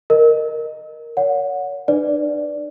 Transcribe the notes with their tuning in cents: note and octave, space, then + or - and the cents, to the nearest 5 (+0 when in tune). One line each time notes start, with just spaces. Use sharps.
A#4 +0 D#5 -10
C#5 +35 F#5 -20
D4 +40 B4 +15 D5 +0